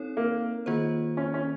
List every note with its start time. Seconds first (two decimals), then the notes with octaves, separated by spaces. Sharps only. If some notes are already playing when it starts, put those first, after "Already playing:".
Already playing: C4 D#4 A4 C#5
0.17 A#3
0.66 D#3 A#3 F4 C5
1.17 C#4
1.34 C#4